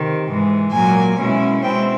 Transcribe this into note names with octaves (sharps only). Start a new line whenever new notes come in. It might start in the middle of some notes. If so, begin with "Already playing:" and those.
Already playing: C3 D#3
G#2 E3 G#3
A#2 F#3 A#3 G#5
B2 G#3 C#4 E4
B2 G#3 C4 E4 G5